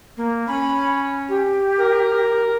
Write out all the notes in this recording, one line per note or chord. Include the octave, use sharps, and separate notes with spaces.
A#3
C#4 B5
G4
A#4